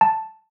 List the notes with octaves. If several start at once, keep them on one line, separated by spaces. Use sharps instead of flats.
A5